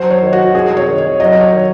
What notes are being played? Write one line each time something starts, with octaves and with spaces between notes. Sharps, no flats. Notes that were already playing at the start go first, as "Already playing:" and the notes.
Already playing: F#3 C5
C#5
D#3
F#4
C2 G#4
C#5
D#3
C#5
F#3 D#5
C#5
D#3